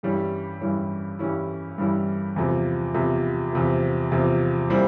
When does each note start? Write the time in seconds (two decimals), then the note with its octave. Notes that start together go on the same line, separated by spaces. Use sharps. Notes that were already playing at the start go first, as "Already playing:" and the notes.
0.03 G2 E3 G3 C#4 E4
0.61 G2 E3 G3 C#4 E4
1.19 G2 E3 G3 C#4 E4
1.78 G2 E3 G3 C#4 E4
2.36 E2 C3 F3
2.94 E2 C3 F3
3.53 E2 C3 F3
4.12 E2 C3 F3
4.70 A#2 G3 C4 E4